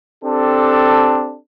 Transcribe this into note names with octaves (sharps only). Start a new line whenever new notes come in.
C4 D4 G4 A4